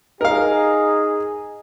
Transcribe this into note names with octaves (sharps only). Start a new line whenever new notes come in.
D#4 G#4 A#4 F5